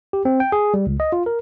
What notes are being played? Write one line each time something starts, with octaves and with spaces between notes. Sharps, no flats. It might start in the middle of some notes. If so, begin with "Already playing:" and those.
G4
C4
G5
G#4
G3
C#2
D#5
F4
A#4